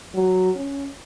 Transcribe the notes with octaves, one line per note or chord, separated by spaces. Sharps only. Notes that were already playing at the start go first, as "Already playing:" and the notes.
F#3
C#4